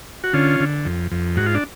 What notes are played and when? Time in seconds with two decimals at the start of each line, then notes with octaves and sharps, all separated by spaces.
0.24 F#4
0.33 D3 C#4 F4
0.60 D3
0.85 F2
1.11 F2
1.36 G#2 F#4
1.46 F4
1.55 D4